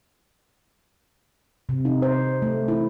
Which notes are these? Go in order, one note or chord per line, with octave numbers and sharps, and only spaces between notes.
C3
D#4
C5
A3
E4